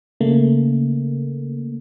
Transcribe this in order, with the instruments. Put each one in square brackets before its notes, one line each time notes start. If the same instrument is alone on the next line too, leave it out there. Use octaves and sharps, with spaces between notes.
[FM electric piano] C#3 A3 A#3